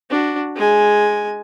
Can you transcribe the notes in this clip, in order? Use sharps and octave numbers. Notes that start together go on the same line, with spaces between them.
D4 F#4
G#3 G#5